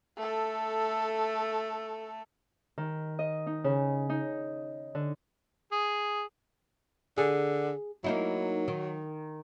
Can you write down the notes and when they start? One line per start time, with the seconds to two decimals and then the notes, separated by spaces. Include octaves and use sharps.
0.17 A3 A4
2.78 D#3
3.19 D#5
3.47 D#4
3.64 C#3
4.10 D#4
4.95 D3
5.72 G#4
7.18 D3 G#4
8.04 F#3 A#3 D#4 E4
8.68 D#3